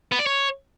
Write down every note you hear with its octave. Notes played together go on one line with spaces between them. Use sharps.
B3
D5
C#5